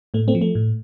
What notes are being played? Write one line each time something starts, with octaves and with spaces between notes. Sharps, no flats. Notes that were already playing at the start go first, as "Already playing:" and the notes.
A2 A3
A3 C4
F3
A3
A2